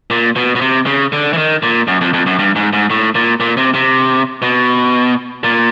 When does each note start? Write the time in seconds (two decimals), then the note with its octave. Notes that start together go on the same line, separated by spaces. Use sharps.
0.10 A#2
0.36 B2
0.55 B2
0.61 C3
0.86 C#3
1.13 D3
1.33 E3
1.37 D#3
1.63 A#2
1.88 F#2
2.01 F2
2.13 F2
2.26 F#2
2.39 G2
2.56 G#2
2.73 G#2
2.90 A2
3.15 A#2
3.40 A#2
3.57 C3
3.74 C3
4.42 B2
5.44 A#2